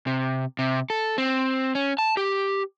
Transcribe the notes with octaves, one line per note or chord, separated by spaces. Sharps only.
C3
C3
A4
C4
C#4
A5
G4